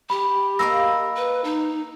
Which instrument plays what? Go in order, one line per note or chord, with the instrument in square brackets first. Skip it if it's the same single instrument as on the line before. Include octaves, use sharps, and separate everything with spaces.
[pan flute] G4 [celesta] B5
[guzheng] A#3 A#4 D#5 [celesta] B5 E6 A#6
[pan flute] B4
D#4